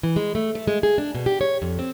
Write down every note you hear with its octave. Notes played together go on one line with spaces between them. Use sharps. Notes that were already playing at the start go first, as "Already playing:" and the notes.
E3
G#3
A3
A3
G#3
G#4
D4
B2
G4
C#5
F2
C4